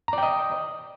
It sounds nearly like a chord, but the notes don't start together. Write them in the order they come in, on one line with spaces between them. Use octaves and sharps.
A#5 D5 G5 D#5